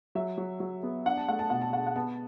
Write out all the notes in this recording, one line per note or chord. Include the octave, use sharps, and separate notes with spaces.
F#3 E5
F#3
F#3
B3
D4 F#5
A5
A3 F#5
A5
B2 F#5
A5
D4 F#5
F#5
B3 A5